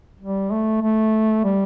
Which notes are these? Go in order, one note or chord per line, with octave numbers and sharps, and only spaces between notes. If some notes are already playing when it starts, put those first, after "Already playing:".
G3
A3
A3
G3